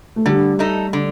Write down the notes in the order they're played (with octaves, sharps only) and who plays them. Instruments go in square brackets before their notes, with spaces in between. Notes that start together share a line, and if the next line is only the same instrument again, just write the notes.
[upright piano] A3
[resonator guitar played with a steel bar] D3 [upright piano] G3
[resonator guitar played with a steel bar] A3 D#4 A4
D3